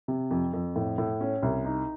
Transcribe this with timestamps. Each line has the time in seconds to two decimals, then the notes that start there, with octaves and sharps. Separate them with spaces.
0.08 C3
0.31 F2
0.53 F2
0.76 A2
0.98 A2
1.21 C#4
1.43 C2
1.65 D#4